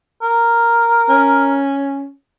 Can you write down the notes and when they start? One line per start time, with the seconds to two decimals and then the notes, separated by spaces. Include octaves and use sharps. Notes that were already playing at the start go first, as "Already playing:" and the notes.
0.23 A#4
1.09 C#4